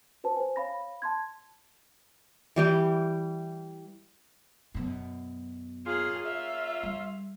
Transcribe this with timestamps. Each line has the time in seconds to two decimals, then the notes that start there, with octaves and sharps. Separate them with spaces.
0.24 F#4 B4 C5 A5
0.36 C5 G#5
0.56 C#5 F5 B5 A#6
1.02 A5 C6 G#6
2.56 E3 G3 G4
4.75 F#2 B2
5.87 A#2 C#4 F4 G#4
6.27 E5
6.83 G3